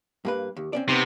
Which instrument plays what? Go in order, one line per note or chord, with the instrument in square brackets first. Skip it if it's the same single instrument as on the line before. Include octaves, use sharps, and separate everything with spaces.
[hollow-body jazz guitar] G2 A#3 B4
D#2
C4 C#4 D5
[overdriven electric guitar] C3 [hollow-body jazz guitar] B3 C4 D#4